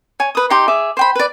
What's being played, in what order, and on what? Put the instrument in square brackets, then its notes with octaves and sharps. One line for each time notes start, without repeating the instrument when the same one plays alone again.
[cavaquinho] C#5 G#5
B4 D#6
D#4 G4 C6
G#4 E5 D6
C5 G5 B5
B4 D5